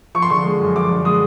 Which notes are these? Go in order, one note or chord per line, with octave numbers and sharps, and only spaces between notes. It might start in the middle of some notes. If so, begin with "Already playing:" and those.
F3 C#6
C6
D3 C#6
G#3
F#2
F3 D6
D3
G#3 D#6